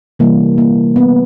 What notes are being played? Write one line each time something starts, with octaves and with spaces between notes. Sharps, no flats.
C3 E3 G3 A#3
A#3
B3